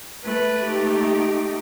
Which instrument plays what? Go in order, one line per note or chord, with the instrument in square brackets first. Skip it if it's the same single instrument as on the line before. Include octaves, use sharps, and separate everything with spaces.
[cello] A3 [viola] B4
[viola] D#4 G4